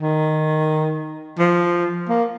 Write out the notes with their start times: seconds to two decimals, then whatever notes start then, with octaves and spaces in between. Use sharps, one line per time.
0.01 D#3
1.39 F3
2.09 A#3